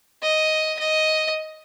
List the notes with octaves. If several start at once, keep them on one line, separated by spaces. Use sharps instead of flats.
D#5
D#5